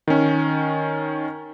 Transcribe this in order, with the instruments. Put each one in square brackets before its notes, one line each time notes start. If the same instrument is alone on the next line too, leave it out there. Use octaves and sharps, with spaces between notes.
[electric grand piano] D#3 C#4